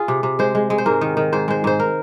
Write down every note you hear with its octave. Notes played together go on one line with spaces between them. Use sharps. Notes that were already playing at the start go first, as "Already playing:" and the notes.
Already playing: F4 G#4
C3
C3
G#3 C5
G#3
G#3
C5
G#2 A#4
D#3
D#3
G#2 C5
G#3 C5
G#2 C5
A#4